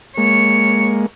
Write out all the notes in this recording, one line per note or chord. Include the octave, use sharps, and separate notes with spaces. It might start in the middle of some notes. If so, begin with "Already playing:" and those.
G#3 A#3 C#5